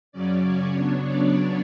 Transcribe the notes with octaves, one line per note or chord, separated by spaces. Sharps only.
F#2 C#3 F#3 C#4 D5
C#5
C#3 F#3 B3 D4
D5